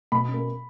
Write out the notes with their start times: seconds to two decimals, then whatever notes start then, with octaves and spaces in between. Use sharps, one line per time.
0.12 B2 B5
0.28 C#4
0.34 A#3